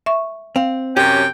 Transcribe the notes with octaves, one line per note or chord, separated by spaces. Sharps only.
E5 C#6
C4 F5
F#2 C3 C#4 G4 G5